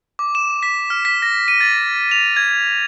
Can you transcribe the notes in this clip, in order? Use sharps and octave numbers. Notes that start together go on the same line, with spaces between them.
D6
E7
B6
F6
B6
A#6
D#7
A6
F7
G#6